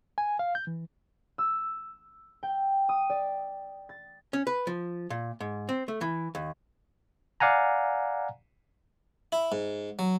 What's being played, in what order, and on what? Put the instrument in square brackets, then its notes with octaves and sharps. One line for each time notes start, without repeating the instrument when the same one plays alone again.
[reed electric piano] G#5
F5
G6
E3
[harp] E6
G5
D#6
D5
A6
[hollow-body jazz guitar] C#4
B4
F3
A#2
G#2
C4
A3
E3
D#2
[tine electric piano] D5 F5 F#5 G#5 A#5
[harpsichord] E4
G#2
F#3